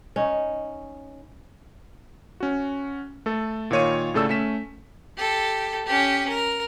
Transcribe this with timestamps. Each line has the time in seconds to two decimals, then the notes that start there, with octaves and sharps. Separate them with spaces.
0.16 C#4 D#4
2.40 C#4 F#4
3.26 A3 A4
3.71 A#2 D#3 F4 C#5 C#6 D#7
4.14 A2 C#3 A3 A4 D5 E6
4.29 A3 C#4 B6 E7
5.17 G4 A4
5.86 C#4 G4
6.28 A#4